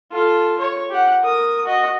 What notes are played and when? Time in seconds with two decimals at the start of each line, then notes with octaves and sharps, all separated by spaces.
0.12 F4 A4
0.59 C#5
0.90 G4 F#5
1.21 A#4 D#6
1.65 F#4 D#5